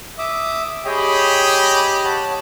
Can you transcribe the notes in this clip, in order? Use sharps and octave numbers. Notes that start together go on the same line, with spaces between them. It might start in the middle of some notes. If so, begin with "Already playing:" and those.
E5 D6 D#6
G4 G#4 C#5 D#5 G5 B5
C#5 F#5 A5